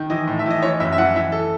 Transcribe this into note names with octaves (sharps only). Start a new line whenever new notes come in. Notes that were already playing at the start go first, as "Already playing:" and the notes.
Already playing: D#3
E3 D#5
A2
E5
E3 D#5
E3 C#5
F#2 E5
E5
E3 F#5
E3 E5
A4